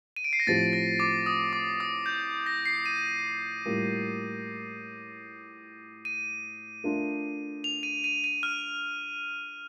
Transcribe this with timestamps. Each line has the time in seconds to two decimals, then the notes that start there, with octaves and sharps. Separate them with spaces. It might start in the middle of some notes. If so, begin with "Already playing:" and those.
0.16 D#7
0.24 D7
0.33 C7
0.40 A#6
0.47 A2 F3 C4 G4 A6
0.73 A#6
1.00 D6
1.26 D#6
1.53 D6
1.80 D#6
2.06 G6
2.46 A#6
2.65 C7
2.86 D#7
3.66 A2 G3 A#3 F4
6.05 D#7
6.84 A3 D4 F4 A#4
7.64 F7
7.83 D#7
8.04 D#7
8.24 D#7
8.43 F6